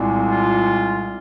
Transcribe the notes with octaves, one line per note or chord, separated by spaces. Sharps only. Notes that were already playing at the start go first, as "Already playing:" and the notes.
Already playing: C2 A#2 G#3 C4
F4